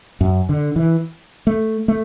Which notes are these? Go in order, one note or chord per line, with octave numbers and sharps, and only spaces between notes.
F#2
D3
E3
A3
A3